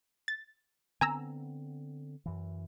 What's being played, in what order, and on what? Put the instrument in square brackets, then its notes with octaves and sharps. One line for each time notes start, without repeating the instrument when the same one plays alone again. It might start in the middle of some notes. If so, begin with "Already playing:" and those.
[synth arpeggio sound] A6
[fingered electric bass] D3 B3 C4 [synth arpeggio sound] G#5 A#5 E6
[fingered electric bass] F#2 E3